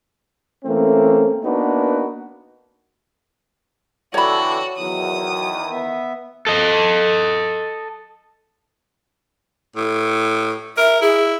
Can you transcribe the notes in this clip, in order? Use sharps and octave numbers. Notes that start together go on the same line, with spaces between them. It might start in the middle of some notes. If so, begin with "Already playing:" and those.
E3 A3 A#3 C4 C#4
A#3 B3 D4 D#4 F#4 B4
D3 E3 F#4 A4 C#5 D5 G5 B5
E2 D#3 F#3 D#6
B3 E5
A4 D#5
A2
A#4 E5
E4 G#4